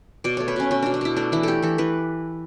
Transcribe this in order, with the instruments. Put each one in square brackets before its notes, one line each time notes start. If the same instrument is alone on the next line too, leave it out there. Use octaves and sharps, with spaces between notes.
[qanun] B2 D5
A3 C#5
B4
B2 C#4
B2 C#4
B2 D4
D4
B2 E4
A3 D4
E3 E4
A3 G4 A4
E3 A4
E3 B4